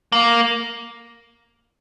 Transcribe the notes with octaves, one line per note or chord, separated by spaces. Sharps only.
A#3